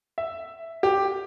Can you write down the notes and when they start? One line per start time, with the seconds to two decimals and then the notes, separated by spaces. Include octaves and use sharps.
0.18 E5
0.83 G4